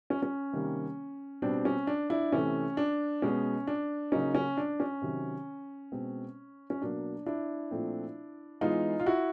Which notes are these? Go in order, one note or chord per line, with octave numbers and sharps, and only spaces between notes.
C#4
C#4
C3 D#3 G3 A#3
B2 G3 C4 D4
C#4
D4
D4 E4
C3 E3 A3 C#4
D4
B2 G#3 B3 C#4
D4
C#3 F#3 A#3 C#4 D#4
C#4
D4
C#4
C3 D#3 F#3
B2 G#3 C4
C#4
B2 F#3 A#3 D4
D4 E4
A#2 F3 A3 C4
E3 G#3 B3 D#4 F4
F4
E4 F#4